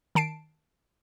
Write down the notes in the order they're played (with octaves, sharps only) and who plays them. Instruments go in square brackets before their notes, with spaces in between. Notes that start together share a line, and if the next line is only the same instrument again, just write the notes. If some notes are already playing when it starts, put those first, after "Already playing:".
[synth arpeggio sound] D#3 A5 C7 D7